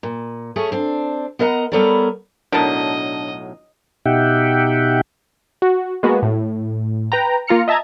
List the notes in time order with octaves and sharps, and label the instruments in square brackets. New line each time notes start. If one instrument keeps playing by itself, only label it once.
[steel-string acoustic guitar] A#2
A3 C#4 G#4
C4 D4
B3 A#4 D#5 F#5 A#5
G3 B3 A4 A#4 C#5 D5
[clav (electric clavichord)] B1 A2 F#3 [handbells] D4 [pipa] A#4 A5 [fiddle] D#5
[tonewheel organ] B2 D#4 G4 E5 F#5 G5
[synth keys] F#4
G#3 A#3 B3 F#4
A2
B4 G5 A#5
A#3 F4 A#5 F6 C#7
D#5 E5 A5 A#5 G#6